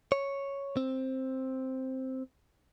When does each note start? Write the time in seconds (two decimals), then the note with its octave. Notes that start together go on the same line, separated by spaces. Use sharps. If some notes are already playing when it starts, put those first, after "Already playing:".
0.12 C#5
0.77 C4